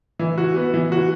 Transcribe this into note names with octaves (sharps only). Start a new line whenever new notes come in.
E3
F#4
B3
E3
F#4